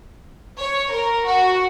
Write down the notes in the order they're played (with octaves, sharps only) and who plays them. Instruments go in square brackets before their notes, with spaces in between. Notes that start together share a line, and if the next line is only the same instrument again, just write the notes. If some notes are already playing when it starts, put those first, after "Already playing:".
[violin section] C#5
A#4
F#4